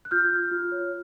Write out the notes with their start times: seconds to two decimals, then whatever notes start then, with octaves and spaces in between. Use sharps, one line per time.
0.05 F#6
0.11 F4 F6 G6
0.31 F4
0.51 F4
0.72 C#5